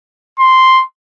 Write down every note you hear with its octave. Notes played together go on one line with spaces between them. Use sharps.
C6